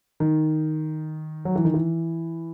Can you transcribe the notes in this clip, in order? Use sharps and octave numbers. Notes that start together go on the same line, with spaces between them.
D#3
F#3
E3
D#3
E3